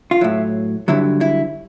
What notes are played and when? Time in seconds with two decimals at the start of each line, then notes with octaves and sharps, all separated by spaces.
0.11 F4
0.21 A2 F#3 E4
0.88 G2 D3 F#3 E4
1.21 E4